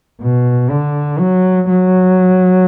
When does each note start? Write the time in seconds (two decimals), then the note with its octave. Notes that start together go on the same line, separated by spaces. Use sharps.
0.21 B2
0.70 D3
1.19 F#3
1.69 F#3